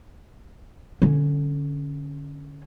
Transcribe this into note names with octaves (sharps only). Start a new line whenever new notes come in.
D3 C#4